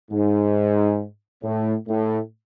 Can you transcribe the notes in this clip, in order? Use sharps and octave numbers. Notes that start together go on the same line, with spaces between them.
G#2
A2
A2